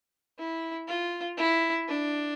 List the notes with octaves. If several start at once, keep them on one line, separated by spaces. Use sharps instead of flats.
E4
F4
E4
D4